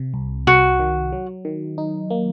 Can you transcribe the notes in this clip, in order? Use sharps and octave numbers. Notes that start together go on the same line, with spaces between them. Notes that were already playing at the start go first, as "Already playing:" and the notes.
Already playing: C3
C2
C2 F#4
D#3
F#3
D#3
D#4
A#3